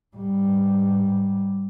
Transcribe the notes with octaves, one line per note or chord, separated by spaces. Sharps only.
G#2 G3